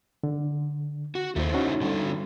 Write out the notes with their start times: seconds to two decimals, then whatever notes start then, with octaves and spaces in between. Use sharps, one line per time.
0.24 D3
1.15 F#4
1.36 D#2 A3 E4 C5
1.54 C#4 D#4 F#4
1.81 D3 G3 A4